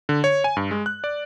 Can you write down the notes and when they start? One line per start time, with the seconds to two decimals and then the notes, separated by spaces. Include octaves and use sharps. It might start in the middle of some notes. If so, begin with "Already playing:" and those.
0.09 D3
0.24 C#5
0.44 G#5
0.57 G2
0.71 G#3
0.86 F#6
1.04 D5